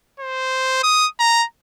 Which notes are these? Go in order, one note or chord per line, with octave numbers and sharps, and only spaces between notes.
C5
D#6
A#5